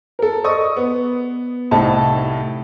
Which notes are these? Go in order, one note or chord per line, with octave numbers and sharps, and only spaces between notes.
A4 A#4
D5 D#5 C#6 D#6
B3
C2 A2 D#4 A5